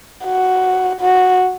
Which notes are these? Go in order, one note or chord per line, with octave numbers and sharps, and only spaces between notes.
F#4
F#4